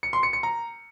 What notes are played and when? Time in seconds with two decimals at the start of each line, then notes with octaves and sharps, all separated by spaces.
0.03 C#7
0.13 C6
0.23 C#7
0.33 C#7
0.43 A#5